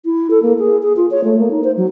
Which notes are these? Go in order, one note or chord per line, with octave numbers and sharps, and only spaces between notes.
E4
A4
A#3
G#4
G#4
F4
C#5
A3
A#3
D#4
C5
F#3